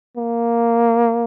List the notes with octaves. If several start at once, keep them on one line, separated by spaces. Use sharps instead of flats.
A#3